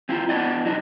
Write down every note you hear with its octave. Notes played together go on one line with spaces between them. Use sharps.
C4 E4 F4
B3 D4 E4 D5 D#5
F#3 D4 D#4